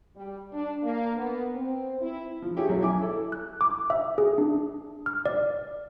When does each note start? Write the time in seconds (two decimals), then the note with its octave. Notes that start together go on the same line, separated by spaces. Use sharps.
0.16 G3
0.53 D4
0.83 A#3
1.17 B3
1.54 C4
2.00 E4
2.42 F3
2.56 E4 G4 G#4 C#5
2.69 B1 F#3
2.81 E4 G#5 D6
3.01 E4 A4
3.32 F#6
3.61 D6
3.90 E5
4.18 G#4
4.38 D4
5.06 F6
5.26 D5